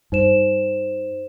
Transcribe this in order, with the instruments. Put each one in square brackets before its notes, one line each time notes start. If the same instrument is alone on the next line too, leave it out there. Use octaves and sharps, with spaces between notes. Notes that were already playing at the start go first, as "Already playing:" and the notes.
[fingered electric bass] G2 [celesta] D#4 C5 E7